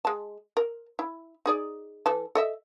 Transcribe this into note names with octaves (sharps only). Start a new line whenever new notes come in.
G#3 A5
A#4
E4
D#4 G#4 D5
E3 A4 A5
A4 D#5 E5